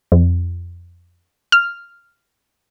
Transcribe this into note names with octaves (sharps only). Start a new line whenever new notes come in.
F2
F6